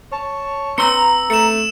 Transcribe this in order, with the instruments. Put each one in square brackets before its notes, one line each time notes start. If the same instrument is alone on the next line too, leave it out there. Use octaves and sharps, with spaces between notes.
[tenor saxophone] C#5 [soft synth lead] A5
[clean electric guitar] C4 B4 C6 [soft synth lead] A#5 [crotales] E6 C#7
[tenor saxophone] A3 [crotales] C#7 E7